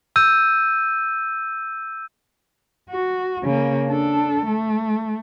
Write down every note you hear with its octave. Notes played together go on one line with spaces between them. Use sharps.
E6 G6 D#7
F#4
C#3 A#3
D4 A4
A3